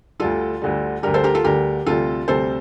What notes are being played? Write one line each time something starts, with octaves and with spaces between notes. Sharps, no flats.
D2 D3 G3 F4 A4
D2 D3 G3
D2 D3 G3 G4 A#4
A4 C5
G4 A#4
F4 A4
D2 D3 G3 G4 A#4
D2 C3 G3 F4 A4
D2 C3 G3 A4 C5